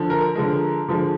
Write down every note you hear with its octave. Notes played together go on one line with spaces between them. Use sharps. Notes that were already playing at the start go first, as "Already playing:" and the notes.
Already playing: D3 F3
A#4
D3 F3 G#3
D3 F3 G#3